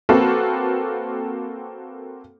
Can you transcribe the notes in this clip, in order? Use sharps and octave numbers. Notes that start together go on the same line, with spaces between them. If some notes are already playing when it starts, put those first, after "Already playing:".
A#3 C4 F#4 A4 B4